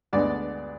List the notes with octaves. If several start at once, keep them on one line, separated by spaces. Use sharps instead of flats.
D2 D3 G#3 B3 D4 D5